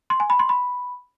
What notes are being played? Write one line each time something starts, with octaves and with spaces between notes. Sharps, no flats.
C6
G#5
B5
C6
B5